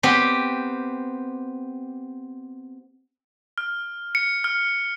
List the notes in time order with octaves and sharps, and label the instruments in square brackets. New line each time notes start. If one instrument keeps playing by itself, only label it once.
[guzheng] B3 C4 G4
[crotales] F6
C#7
F6